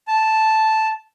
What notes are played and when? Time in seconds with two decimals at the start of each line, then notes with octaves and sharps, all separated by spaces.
0.08 A5